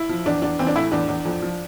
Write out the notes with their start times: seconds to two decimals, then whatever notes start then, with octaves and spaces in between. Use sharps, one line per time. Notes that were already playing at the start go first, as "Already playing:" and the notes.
Already playing: E4
0.09 F3
0.26 E2 D4
0.42 E2 D4
0.59 E3 C4
0.67 D4
0.76 A2 E4
0.92 E2 D4
1.08 E2
1.25 F2
1.42 F3